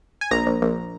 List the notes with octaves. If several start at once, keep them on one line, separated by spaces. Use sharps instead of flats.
G#5
A#1 A#5
A#1
A#1